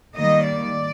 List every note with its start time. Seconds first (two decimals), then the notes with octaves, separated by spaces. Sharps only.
0.16 D#3 G3 A#3 D#5
0.49 D5